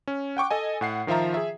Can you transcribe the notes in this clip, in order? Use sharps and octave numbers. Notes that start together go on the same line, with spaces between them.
C#4
F#5 G5 C#6 D6
A4 D#5 G#5
A2 F#5 C7
D#3 F3 F4 E5 A#5
G#4 E5